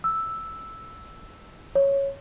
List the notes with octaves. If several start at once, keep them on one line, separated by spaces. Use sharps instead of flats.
E6
C#5